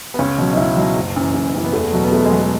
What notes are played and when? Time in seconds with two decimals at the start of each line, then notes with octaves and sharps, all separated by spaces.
0.14 B3
0.19 C#2 C#4
0.38 B2 F#3
0.53 D#4
0.57 C#2 E4
0.77 B2 F#3
0.96 F#1
1.16 F#2 E3
1.34 F#1
1.54 F#2 E3
1.65 B3
1.73 E2 A3
1.93 B2 F#3
2.04 B3
2.12 E2 A3
2.25 G#3
2.31 B2 F#3
2.39 A3